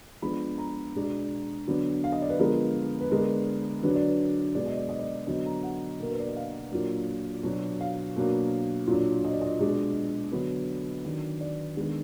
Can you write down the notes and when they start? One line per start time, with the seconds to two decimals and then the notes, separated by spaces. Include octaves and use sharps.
0.22 F3 G#3 B3 D4 B5
0.58 A#5
0.95 B2 G#3 D4
1.67 D3 F#3 B3 D4
2.04 F5
2.12 D#5
2.22 D5
2.30 B4
2.39 D3 F3 G#3 B3 A#4
3.01 B4
3.10 D3 G#3 B3 D4 A#4
3.83 D3 F#3 D4 B4
3.95 D5
4.07 B4
4.55 B2 G#3 B3 D4 D5
4.66 D#5
4.77 D5
4.89 D#5
4.99 D5
5.27 D3 F#3 B3 D4 D#5
5.46 A#5
5.63 F#5
6.00 B2 A#3 D4 A#4
6.11 B4
6.19 D5
6.28 D#5
6.36 F5
6.72 A#2 F#3 A#3 D4
7.43 B2 F#3 D4
7.80 F5
8.16 B2 F#3 A#3 D4
8.87 A#2 F#3 D4
9.24 D#5
9.33 D5
9.41 D#5
9.60 B2 G#3 D4
10.32 D3 F#3 B3 B4
11.05 D#3 F#3 D4
11.41 D5
11.77 D#3 G#3 B3 D4